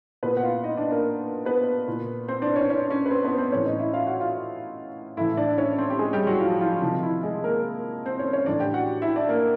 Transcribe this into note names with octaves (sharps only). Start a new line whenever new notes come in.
A#2 B3 B4
F#5
F4 F5
D#4 D#5
D4 D5
A#3 A#4
B3 B4
A#2
C4 C5
D4 D5
C#4 C#5
C#4 C#5
C#4 C#5
B4
C4 C5
B3 B4
C4 C5
A2 E3 C#4 C#5
D#4 D#5
E4 E5
F4 F5
F#4 F#5
F4 F5
A2 E3 E4 E5
D4 D5
C#4 C#5
C4 C5
G4
G#3 G#4
G3 G4
F#3 F#4
F3 F4
F3 F4
C3 D#3 F3 F4
E4
G#3 G#4
A#3 A#4
C4 C5
C#4 C#5
C#4 C#5
A2 E3 D4 D5
G4 G5
F#4 F#5
E4 E5
D4 D5
A#3 A#4